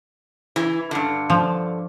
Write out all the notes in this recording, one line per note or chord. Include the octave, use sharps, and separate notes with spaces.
E3
G2 D3
F3